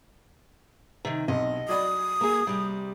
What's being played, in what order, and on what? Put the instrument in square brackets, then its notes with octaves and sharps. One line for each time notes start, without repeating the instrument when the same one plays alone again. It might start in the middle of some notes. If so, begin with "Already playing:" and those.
[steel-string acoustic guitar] C3 D#3
[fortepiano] B1 C3 [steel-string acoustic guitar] D#5
[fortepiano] F#3 D5 B5 [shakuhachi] D#6
[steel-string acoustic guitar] A#3 G#4
C3 G3